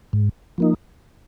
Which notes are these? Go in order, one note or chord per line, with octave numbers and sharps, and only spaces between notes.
G#2
F3 A#3 D#4